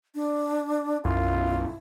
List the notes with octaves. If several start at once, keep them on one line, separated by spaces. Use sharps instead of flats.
D4
B1 F#2 E4 F4